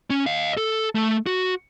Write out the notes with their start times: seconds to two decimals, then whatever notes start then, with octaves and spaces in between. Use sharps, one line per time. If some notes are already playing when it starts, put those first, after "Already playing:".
0.10 C#4
0.26 D#5 F5
0.57 A4
0.95 A3
1.26 F#4